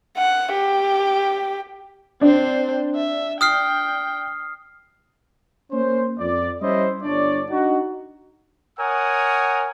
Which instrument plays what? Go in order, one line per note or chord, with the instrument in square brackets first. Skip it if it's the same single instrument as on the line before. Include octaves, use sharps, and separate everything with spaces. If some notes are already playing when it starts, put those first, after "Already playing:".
[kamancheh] F#5
G4
[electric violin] C4 C5 [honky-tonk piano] D4
[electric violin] E5
[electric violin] G5 [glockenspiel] D#6 F6 C7
[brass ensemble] A#3 C#4 C5
F2 D5
G3 C#4 E4 C5 D#5
G1 D4 C#5 D5
D4 D#4 F#4
[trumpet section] A#4 C#5 F#5 G#5 D#6